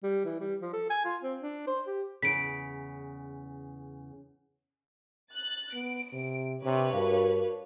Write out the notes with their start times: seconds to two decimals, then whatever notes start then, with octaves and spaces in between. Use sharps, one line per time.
0.03 G3
0.25 E3
0.40 G3
0.62 F3
0.73 A4
0.90 G#5
1.04 F4
1.23 C4
1.42 D4
1.67 C5
1.87 G4
2.22 E2 C#3 B6 D7
5.30 F#6 A6
5.73 B3 D7
6.13 C3
6.63 C3 D4 B4 C#5
6.93 G2 F#4 A#4 F5